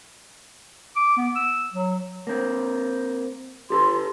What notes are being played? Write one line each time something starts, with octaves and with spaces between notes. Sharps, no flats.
D6
B3
E6
F#3
A#3 C4
G4 A4 B4 C6